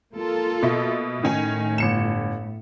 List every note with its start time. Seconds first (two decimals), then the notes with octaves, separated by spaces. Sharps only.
0.15 A#3 F4 A4
0.63 B2 E5
1.24 A2 D#3 C#4 G#5
1.78 G1 C#7 E7